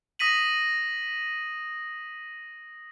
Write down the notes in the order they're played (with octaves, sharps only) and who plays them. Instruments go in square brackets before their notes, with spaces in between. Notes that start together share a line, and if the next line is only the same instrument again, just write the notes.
[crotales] D#6 A#6 B6 D#7 F#7